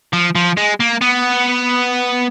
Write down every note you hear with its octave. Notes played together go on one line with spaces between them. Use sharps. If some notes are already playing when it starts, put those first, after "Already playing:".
F3
F3
G#3
A#3
B3